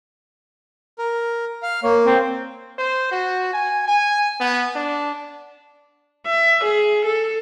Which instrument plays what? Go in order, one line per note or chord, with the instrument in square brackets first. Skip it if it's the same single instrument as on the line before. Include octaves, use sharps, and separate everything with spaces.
[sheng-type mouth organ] A#4
F5
[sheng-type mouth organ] A#3 [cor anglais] C#5
[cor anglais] C4
[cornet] C5
F#4
G#5
G#5
B3
D4
[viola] E5
G#4
A4